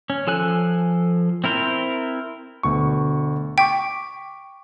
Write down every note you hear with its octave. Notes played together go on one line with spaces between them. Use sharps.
C#4
F3 A4 G#5 F#6
C4 E4 A#4 C5
D2 B2 C#6
G5 C#6 D6 B6